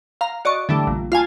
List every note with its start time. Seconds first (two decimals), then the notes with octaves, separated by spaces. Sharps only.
0.21 F5 A#5
0.45 F#4 D5 D#5 C#6
0.69 D3 E3 G3 A3
0.87 A#1
1.12 F4 F5 G#5 A5